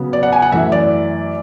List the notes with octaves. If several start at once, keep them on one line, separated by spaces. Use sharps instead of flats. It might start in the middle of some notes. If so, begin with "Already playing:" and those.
Already playing: C#3 F#3 B3
D5
F#5
G#5
F#5
F#2 E3 A3 E5
D5